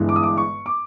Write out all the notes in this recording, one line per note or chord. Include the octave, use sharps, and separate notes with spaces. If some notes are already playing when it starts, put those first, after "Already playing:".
Already playing: G1 G2 E3 G#3
D6
D#6
D6
C#6
D6